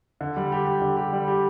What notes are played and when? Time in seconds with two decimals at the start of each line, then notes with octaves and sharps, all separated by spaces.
0.21 D3
0.37 G3
0.52 G4
0.67 G4
0.81 D3
0.97 G4
1.13 G3
1.28 G4